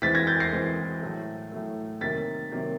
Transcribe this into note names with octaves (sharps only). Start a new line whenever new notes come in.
E3 G#3 C4 A6 B6
G#6 A#6
G6 A6
A#6 C7
E3 G#3 C4
A2 F#3 A3
A2 F#3 A3
C3 D#3 F#3 A#3 A6 B6
C3 D#3 F#3 A#3